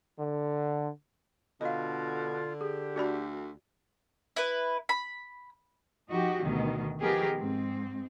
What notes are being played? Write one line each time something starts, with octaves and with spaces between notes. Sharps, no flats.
D3
B2 D3 F4 D#5 F5
G4 G#4
D2 F#4 D5 B5
E4 B4
B5
F3 D#4 F#4 G4
D2 B2 D#3
D#3 F3 B3 G4 G#4 A#4
G#2 C4